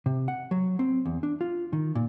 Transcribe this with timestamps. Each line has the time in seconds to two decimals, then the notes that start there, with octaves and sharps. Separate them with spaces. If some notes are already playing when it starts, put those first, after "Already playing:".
0.06 C3
0.28 F#5
0.51 F#3
0.79 C4
1.05 E2
1.23 D4
1.41 F4
1.73 D#3
1.95 A#2